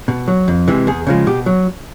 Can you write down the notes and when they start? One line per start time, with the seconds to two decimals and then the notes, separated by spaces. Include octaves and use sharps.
0.08 B2
0.28 F#3
0.48 F2
0.68 C3 E3 G#3
0.87 E2 G#4
1.07 C#3 F3 G#3
1.27 B2 G4
1.46 F#3